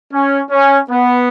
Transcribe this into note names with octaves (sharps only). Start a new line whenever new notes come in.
C#4
C#4
B3